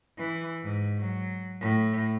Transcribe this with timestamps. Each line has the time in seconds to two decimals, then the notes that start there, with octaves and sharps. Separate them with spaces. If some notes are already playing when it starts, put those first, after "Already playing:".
0.19 E3
0.63 G#2
0.99 F#3
1.61 A2